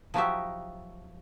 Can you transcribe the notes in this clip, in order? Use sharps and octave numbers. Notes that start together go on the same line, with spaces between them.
F3 F#3 D#4 F#4 G4 E5